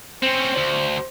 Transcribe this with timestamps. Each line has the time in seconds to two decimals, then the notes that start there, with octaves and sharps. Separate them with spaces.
0.23 C4 C#4 C5
0.58 D2